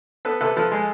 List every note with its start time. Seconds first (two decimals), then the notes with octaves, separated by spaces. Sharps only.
0.25 B3 A4 B4
0.41 C3 A4 B4
0.57 F3 A4 B4
0.72 G#3